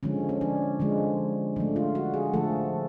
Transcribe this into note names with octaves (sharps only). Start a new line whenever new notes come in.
D3 F3 G#3 C#4
C#4
D4
D3 F3 G#3
D3 F3 A3 D4
F4
F#4
G#4
D3 F3 A3 A4